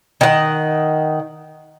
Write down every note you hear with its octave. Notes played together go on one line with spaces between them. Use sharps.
D#3 F#5